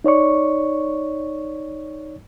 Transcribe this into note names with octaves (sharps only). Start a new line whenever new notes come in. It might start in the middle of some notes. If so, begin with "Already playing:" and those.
D#4 C#5 D5 C#6